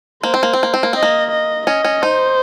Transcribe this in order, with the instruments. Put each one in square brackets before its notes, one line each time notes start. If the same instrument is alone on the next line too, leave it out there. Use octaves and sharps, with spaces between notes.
[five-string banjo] A#3 [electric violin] C5
[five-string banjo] C4
A#3
C4
A#3
C4
A#3
[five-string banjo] C4 [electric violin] D#5
[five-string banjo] A#3
[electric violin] D#5
[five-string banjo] C#4 [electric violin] D#5
[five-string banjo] C#4
[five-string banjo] D#4 [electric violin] C5